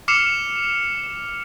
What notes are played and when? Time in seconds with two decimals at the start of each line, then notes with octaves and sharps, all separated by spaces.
0.08 D6 F6 C7 C#7 E7 F7